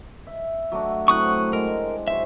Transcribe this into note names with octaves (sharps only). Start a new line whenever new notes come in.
E5
F#3 A3 D4
A2 F#3 C4 C#6 D#6 F#6
G#3 A#4
F#3 C5 E5 G#5